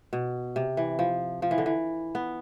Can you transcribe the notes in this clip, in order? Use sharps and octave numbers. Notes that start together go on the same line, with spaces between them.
B2
C3
E3
F3
F3
E3
D3
E3
B3